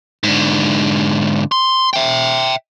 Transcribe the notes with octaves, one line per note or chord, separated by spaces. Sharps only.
G#2 D3
C6
E5 G5